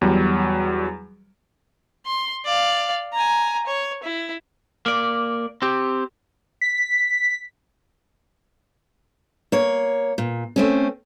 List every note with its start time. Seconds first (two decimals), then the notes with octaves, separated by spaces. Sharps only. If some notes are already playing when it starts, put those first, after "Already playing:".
0.01 E2 F#3 G3
2.06 C6
2.45 D5 F5
3.13 G#5 A#5
3.67 C#5
4.03 E4
4.86 A#3 D5
5.62 C4 G4
6.61 B6
9.52 A#3 C#5
10.18 A#2
10.56 A3 C4 C#4